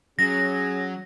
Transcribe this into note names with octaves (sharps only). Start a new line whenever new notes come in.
F#3 C#4 G#4 A#6